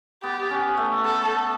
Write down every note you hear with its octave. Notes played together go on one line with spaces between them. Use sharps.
B3 G4
C#4
A3
B3 A4